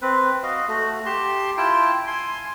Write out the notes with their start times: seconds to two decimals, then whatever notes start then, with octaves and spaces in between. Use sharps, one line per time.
0.02 C4 B4
0.43 F#4 D#5 F5
0.68 A3 F#4
1.06 G4 A5 C6
1.57 E4 F4 G5 A5
2.07 G#5 C6